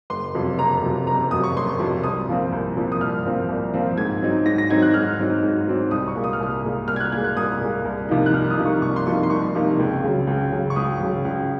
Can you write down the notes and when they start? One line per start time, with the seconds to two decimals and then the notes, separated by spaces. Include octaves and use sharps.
0.10 F#1 C6
0.35 F2 C3 F#3
0.58 F#1 A#5
0.82 F2 C3 F#3
1.07 F#1 A#5
1.31 F2 C3 F#3 D#6
1.43 C#6
1.56 F#1 C6
1.69 C#6
1.80 F2 C3 F#3
2.04 C2 D#6
2.28 A#2 F3 C4
2.52 C2
2.76 A#2 F3 C4
2.92 D#6
3.00 C2 F6
3.26 A#2 F3 C4
3.49 C2
3.74 A#2 F3 C4
3.97 G#2 G#6
4.22 F#3 C4 D#4
4.46 G#2 A#6
4.58 A#6
4.70 F#3 C4 D#4 G#6
4.82 F#6
4.94 G#2 F6
5.19 F#3 C4 D#4
5.43 G#2
5.68 F#3 C4 D#4
5.91 C2 D#6
6.08 C#6
6.16 A#2 G#3
6.24 D#6
6.33 F6
6.40 C2 D#6
6.64 A#2 G#3
6.88 C2 F6
6.96 G#6
7.00 F#6
7.12 A#2 G#6
7.17 G#3
7.24 F#6
7.37 C2 D#6
7.61 A#2 G#3
7.85 C2
8.09 C3 F3 A#3 D#4
8.26 F#6
8.33 C2 F6
8.50 D#6
8.57 C3 F3 A#3 D#4
8.66 C#6
8.82 C2 C#6
8.96 C6
9.06 C3 F3 A#3 D#4 C#6
9.23 C6
9.30 C2 C#6
9.55 C3 F3 A#3 D#4
9.79 C#2
10.03 C#3 F#3
10.27 C#2
10.52 C#3 F#3
10.70 C#6
10.76 C#2 D#6
11.00 C#3 F#3
11.25 C#2